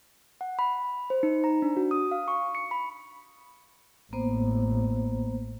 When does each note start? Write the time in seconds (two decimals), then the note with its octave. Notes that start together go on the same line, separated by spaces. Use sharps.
0.41 F#5
0.59 B5
1.10 C5
1.23 D#4
1.44 A#5
1.62 D4
1.77 F#4
1.91 D#6
2.11 F5
2.28 C#6
2.55 C#7
2.71 B5
4.13 A1 A#3 B3 C5